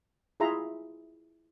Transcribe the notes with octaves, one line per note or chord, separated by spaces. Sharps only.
E4 F4 G#4 E5 A#5 C6